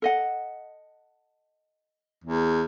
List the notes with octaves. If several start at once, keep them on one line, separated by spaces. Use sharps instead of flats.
A4 D#5 F#5
E2